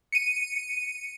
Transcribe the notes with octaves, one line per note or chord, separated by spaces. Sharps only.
C#7 D#7